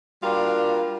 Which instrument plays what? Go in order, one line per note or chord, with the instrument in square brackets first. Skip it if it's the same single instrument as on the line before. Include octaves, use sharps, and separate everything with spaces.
[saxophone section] G3 A#3 D4 F4 F#4 A#4